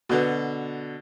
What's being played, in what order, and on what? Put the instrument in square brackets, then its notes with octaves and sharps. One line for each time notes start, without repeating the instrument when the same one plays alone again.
[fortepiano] B2 D3 [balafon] F#4 A4 B4